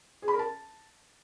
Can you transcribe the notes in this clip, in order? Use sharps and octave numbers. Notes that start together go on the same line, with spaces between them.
G#4
B5
A#4
A5